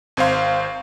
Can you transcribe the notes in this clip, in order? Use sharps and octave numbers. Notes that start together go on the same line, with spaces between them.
G#1 C4 C5 F5 C6